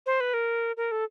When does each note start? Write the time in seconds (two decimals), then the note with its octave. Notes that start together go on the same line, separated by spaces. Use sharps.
0.06 C5
0.20 B4
0.34 A#4
0.77 A#4
0.91 A4